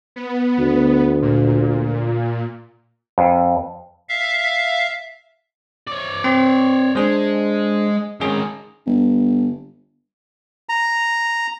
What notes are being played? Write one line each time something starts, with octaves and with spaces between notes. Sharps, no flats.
B3
D2
A#2
F2
E5 F5
C#5 D5
C4 C6
G#3 D4 G#4 C5
G#2 D#3 G#3 C#4 G#4
G1
A#5